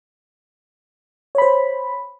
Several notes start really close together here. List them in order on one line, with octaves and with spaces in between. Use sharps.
C#5 B5 C5